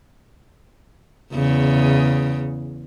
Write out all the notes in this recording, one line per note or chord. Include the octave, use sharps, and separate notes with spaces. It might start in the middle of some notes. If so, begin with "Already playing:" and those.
E2 C#3